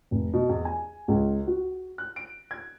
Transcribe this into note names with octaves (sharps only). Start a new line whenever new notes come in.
F1
B2
E2
G#5
C#2
F#4
F#6
D7
G#6